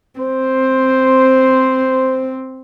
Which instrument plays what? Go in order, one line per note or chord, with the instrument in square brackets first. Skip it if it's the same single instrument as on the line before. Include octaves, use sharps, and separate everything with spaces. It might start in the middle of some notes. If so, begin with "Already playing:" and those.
[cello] C4 [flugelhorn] C5